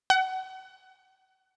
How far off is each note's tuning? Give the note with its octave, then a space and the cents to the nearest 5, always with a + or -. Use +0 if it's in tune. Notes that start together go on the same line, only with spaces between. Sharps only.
F#5 +30